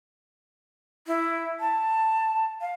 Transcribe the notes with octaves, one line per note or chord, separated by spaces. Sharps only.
E4
A5
F5